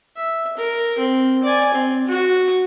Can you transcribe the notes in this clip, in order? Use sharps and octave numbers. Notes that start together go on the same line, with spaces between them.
E5
A#4
C4
D5 G#5
C4
F#4